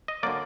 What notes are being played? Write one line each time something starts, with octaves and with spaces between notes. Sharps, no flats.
D#5
D3 F#3 A#3 D5